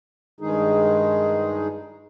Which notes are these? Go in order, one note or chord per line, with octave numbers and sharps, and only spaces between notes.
G2 D#3 G#3 D#4 G#4